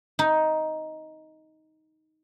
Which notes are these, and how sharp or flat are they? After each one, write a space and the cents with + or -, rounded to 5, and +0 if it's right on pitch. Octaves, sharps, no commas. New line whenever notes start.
D#4 +10